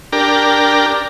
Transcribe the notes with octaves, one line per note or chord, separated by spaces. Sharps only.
D4 G4 A#4